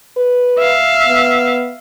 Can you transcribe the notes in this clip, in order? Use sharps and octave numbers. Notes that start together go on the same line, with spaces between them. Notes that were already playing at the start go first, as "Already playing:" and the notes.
B4
E5 F5
B3